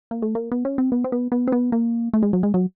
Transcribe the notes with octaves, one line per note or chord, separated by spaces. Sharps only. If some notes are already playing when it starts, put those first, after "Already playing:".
A#3
A3
A#3
B3
C#4
C4
B3
C4
B3
B3
C4
B3
A#3
A3
G#3
F#3
G#3
F#3